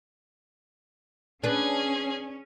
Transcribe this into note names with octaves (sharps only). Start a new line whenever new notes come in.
C#4 D4 G#4 B4